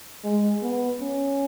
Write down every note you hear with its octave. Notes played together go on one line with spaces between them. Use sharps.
G#3
B3
C#4